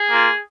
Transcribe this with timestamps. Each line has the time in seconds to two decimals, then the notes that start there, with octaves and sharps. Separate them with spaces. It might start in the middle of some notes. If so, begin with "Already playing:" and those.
Already playing: G#4
0.09 A#3 F4